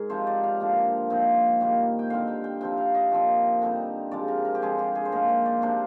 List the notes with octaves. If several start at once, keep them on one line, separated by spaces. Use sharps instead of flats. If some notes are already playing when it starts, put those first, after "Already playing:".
Already playing: G#2 G#4 A#4
C3 F3 C4 D#4 C5
D5
F5
D3 F3 A#3
A#2 F3 C4 D#4
D#3 G3 A#3
G5
D3 G3 C4 D#4 F5
G5
G5
C3 F3 C4 G5
F5
D#5
A#2 F3 C4 D#4
D3 G3 C4 D#4
C3 F3 G#3 D5
A#4
A#4
G4
D3 F3 G#3 C4 G#4
G4
G#4
C5
A#2 F3 A#3 D#4 A#4
C5
D5
C3 F3 A#3 D4 C5